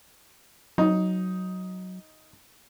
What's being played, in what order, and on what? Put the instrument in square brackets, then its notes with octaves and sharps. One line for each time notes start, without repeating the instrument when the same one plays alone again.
[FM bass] F#3 [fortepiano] D#4